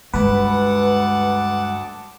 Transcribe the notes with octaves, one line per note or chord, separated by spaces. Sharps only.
D2 G2 G#3 B4 F#5 A5 D6